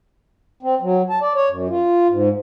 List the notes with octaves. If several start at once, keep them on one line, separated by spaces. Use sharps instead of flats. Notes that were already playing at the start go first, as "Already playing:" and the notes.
C4
F#3
A5
D5
C#5
F#2
F4
G#2